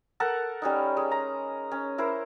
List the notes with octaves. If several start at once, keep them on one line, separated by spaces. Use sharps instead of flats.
A4 A#4 F#5 A5
G3 C#4 D#4
G#3
A#5
C#4
E4 A#4 C5